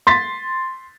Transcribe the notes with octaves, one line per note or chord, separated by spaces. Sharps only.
C6 A6 B6